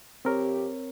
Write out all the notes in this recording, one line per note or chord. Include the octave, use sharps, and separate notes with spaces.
F2 C4 G4 A#4 C#5